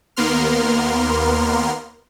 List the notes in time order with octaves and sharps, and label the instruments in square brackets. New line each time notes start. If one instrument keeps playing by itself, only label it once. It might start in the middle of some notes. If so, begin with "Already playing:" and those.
[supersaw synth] D#2 A#3 B3 A#4 C6 F6